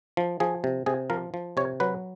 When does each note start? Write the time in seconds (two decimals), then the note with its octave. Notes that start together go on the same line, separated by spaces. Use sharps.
0.17 F3
0.40 F3 G#4
0.64 C3
0.86 C3 G#4
1.10 F3 A#4
1.34 F3
1.57 C3 C#5
1.80 F#3 B4